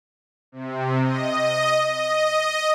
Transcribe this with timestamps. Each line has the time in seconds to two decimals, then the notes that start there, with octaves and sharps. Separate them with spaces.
0.52 C3
1.02 D#5
1.89 D#5